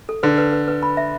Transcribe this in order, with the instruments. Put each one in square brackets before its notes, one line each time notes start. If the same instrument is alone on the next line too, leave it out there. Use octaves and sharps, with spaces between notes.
[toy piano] A4
[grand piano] D3 [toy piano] B4
[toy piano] B4
B4
B4
B5
E5